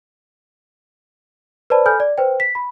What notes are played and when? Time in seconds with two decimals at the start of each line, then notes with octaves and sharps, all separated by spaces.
1.70 B4 C5 D5 A5 B5
1.86 A4 G#5 B5 F6 G6
2.00 D5
2.18 B4 C5 G5
2.40 B6
2.55 B5